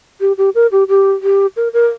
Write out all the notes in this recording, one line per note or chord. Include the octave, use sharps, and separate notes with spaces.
G4
G4
A#4
G4
G4
G4
A#4
A#4